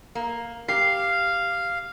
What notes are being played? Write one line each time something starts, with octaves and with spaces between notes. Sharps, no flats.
A#3
G4 F5 C7